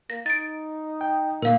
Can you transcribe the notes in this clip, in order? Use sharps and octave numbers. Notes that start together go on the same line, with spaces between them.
A#3 A#6
D#4 A6 D7
G5
A#2 A#3 A#4 F5